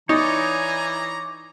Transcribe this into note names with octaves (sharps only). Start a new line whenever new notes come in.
E3 D#4 C#5 D5 G#5 A#5